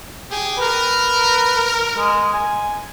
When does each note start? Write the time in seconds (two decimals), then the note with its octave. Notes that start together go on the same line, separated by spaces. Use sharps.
0.29 G4 G#4
0.58 A#4 B4
1.97 G#3
2.33 G#5